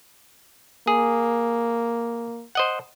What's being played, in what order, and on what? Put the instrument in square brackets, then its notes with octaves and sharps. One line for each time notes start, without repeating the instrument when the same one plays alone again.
[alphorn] A#3 [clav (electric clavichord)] G#4
[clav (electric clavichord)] C5 D#5 F#5